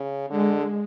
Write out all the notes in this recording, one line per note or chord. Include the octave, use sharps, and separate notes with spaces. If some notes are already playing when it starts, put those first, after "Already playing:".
Already playing: C#3
D3 G#3